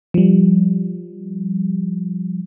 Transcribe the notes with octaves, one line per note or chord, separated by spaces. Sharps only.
F3 G3